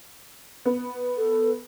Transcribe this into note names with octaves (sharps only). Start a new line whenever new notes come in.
B3
A4